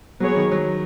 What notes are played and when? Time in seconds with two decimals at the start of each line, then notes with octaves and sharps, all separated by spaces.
0.20 F#3 B3 G#4 C#5
0.36 D#3
0.51 F#3